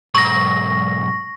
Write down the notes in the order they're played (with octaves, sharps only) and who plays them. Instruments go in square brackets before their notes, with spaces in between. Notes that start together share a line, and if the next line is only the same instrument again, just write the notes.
[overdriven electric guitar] B1 G#2 [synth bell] C#6 A#6